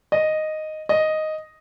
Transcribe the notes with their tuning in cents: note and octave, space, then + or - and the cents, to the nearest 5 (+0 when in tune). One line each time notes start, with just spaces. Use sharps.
D#5 -5
D#5 +0